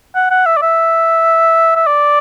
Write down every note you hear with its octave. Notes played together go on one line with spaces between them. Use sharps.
F#5
F#5
E5
D5
E5
E5
D5